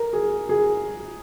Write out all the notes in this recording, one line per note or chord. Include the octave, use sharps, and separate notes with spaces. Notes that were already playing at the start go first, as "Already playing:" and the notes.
Already playing: A#4
G#4
G#4